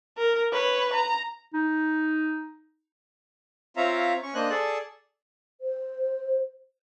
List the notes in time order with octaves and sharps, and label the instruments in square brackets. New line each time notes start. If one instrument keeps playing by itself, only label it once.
[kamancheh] A#4
B4 C#5
A#5
[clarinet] D#4
[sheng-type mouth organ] C4 F4 C#5 E5 F5 A#5
C#4 C#6
A#3 D4 C5 D#5 F#6
G#4 A4 D5 A5
[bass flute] C5